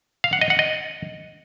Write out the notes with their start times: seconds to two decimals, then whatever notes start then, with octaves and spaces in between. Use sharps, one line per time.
0.24 F5
0.33 F#5
0.41 D#5
0.50 F#5
0.59 D#5